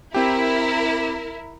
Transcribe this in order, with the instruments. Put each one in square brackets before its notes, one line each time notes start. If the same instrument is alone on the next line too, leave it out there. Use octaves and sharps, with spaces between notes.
[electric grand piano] C4 G4 [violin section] E4 A#4